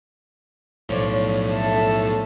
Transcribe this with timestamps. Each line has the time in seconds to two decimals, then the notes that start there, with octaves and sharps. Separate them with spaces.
0.89 B1 A2 F3 C#5 D5
1.53 A4 E5